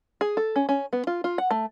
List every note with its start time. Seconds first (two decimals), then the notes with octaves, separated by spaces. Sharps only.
0.21 G#4
0.37 A4
0.56 C#4
0.69 C#4
0.93 B3
1.07 F4
1.24 F4
1.38 F#5
1.51 A3